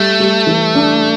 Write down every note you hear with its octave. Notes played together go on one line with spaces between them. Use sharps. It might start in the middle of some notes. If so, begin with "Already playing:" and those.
Already playing: G3 A3
G3
E3
D4